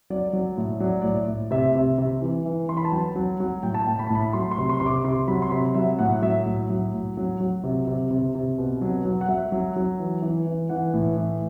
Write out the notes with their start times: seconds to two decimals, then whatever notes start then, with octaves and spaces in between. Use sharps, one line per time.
0.10 F#3 D5
0.33 F#3
0.57 A2
0.80 F#3 D5
1.02 A2 D5
1.28 A2
1.51 C3 E5
1.75 C3
1.98 C3
2.21 E3
2.45 E3
2.68 E3 C6
2.77 B5
2.85 A5
2.92 F#3 G5
3.16 F#3
3.40 F#3
3.63 A2 G5
3.74 A5
3.87 A2 G5
3.99 B5
4.07 A5
4.10 A2 B5
4.33 F#3 C6
4.51 C6
4.58 C3
4.70 C6
4.80 C3 C6
4.86 D6
5.04 C3 C6
5.28 F#3 B5
5.42 C6
5.51 C3 B5
5.75 F#3 E5
5.99 A2 F#5
6.22 F#3 E5
6.46 A2
6.70 F#3
6.94 A2
7.17 F#3
7.40 F#3
7.64 C3
7.87 C3
8.11 C3
8.35 C3
8.58 B2
8.81 F#3
9.05 F#3
9.21 F#5
9.28 F#3 E5
9.52 F#3
9.76 F#3
9.99 E3
10.22 E3
10.47 E3
10.69 E3 F#5
10.93 A2
11.17 E3